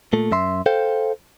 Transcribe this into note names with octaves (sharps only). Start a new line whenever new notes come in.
A#2 A3
F#2 E5 C6
A4 C5 F5 G5